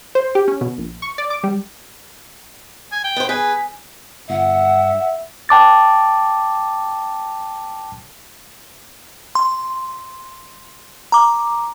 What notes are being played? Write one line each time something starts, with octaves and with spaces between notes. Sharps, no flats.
C5
G4
C#4
B2
A#1
C#6
D5
D6
G3
G#5
G5
B3 C5
G#4 B4
G1 E5 F#5
G5 A5 D6 A6
C6
A#5 D6